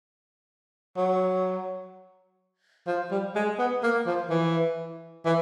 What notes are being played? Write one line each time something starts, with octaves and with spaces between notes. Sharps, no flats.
F#3
F3
G3
G#3
B3
A#3
F3
E3
E3